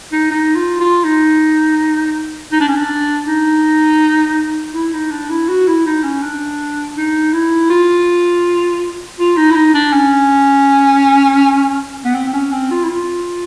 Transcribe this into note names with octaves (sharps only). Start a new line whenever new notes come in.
D#4
D#4
F4
F4
D#4
D#4
D4
C#4
D4
D#4
E4
D#4
D4
E4
F#4
E4
D#4
C#4
D4
D#4
E4
F4
F4
D#4
E4
D#4
D4
C#4
B3
C4
C4
C#4
C4
F4
E4
F4